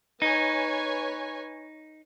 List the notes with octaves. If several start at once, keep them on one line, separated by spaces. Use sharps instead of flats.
D#4 B4 C#5 G#5